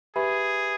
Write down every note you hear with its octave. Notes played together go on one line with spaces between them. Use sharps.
G4 G#4 B4 E5 G#5 B5